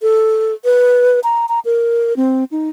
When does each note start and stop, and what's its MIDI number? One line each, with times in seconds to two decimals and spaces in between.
0.02 0.54 69
0.65 1.20 71
1.24 1.46 82
1.49 1.59 82
1.65 2.16 70
2.17 2.44 60
2.52 2.69 63